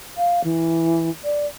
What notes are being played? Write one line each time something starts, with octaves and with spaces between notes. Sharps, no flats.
F5
E3
D5